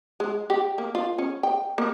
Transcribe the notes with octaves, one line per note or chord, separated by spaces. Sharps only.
G#3
G4
A#3
F4
C#4
G5
A#3